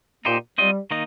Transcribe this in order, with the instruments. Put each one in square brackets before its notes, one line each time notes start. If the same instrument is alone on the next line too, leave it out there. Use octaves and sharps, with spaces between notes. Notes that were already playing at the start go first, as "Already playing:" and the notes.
[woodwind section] A#2 A#3 [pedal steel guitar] D#4 G4 C5
[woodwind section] G3 [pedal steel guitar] C4 F4 D#5
[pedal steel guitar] D#3 A#3 D#4 D#5